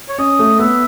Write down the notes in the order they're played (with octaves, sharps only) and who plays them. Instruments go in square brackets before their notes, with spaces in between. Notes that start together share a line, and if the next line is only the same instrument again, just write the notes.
[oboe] C#5
[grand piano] C#4 [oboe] D#5
[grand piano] A3
[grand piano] B3 [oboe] E5